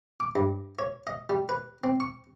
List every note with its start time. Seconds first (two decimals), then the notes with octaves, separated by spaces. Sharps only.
0.20 D6
0.36 G2
0.79 C#5
1.07 D#5
1.30 G3
1.49 B4
1.84 C4
2.00 C#6